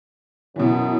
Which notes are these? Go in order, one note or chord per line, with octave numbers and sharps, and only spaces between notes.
F#2 B2 E3